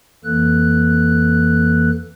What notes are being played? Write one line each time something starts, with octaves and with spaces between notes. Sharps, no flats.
F2 E3 A#3 A4 F#6